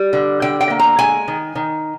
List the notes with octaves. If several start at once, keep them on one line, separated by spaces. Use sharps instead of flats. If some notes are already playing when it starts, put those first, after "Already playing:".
Already playing: G3
D3
D3 G5
G5
A#3
A#5
G#3 G#5
D#3
D#3